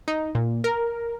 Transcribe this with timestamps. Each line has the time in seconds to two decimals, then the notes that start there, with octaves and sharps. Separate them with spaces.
0.08 D#4
0.35 A#2
0.64 A#4